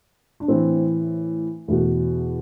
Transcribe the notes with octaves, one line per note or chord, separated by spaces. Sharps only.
D4
A2 E3 C4
E2 B2 A3